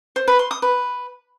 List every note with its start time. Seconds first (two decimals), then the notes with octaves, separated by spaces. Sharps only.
0.16 C5
0.28 B4
0.39 C6
0.51 D#6
0.62 B4